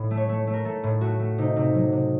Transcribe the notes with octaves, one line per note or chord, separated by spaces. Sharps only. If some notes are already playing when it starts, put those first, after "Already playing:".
Already playing: A2
A3
C#5
A3
A3
A#4
A3 A4
A2
A3 F#4
A3
C3 D#4
C3
F#3
C3